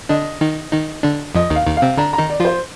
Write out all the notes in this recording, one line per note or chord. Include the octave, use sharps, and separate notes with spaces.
D3 D4 D#5
D#3 D#4
D#3 D#4
D3 D4
F2 F3 D#5
D#2 D#3
F5
D#2 D#3
F5
C3 C4
D3 D4 A#5
A#5
D#3 D#4
D5
F3 F4 C5